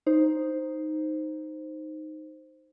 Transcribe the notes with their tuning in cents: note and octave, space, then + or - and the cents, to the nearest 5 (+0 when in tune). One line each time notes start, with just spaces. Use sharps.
D#4 +0 C5 +0